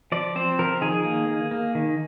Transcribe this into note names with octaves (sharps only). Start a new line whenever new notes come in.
F3 D5
C4 C5
F3 A#4
D#3 G#4
A#3
A#3
A#3
D#3